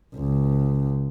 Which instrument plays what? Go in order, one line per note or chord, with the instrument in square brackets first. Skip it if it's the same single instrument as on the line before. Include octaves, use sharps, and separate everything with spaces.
[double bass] C#2